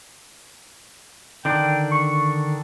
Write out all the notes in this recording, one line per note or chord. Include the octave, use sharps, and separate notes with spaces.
D3 D#3 D4 G5
C#6